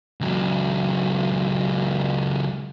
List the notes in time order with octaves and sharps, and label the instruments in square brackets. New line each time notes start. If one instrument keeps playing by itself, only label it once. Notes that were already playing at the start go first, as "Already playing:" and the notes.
[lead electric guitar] C#2 F#3